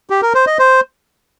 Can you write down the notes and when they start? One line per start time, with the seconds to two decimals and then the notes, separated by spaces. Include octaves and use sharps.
0.10 G4
0.22 A#4
0.34 C5
0.47 D#5
0.59 C5